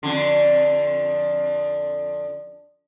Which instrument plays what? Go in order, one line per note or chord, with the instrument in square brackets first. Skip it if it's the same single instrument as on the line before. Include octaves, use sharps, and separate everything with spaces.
[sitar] F2 D3